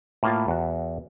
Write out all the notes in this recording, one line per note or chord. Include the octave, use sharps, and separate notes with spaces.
A2 A#3 F4
E2 F#4